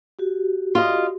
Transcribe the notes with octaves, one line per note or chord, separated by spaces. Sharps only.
F#4 G4
F4 D#5